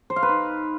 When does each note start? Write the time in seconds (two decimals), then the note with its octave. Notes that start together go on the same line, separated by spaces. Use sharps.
0.10 C5
0.16 F5
0.23 B4
0.29 D#4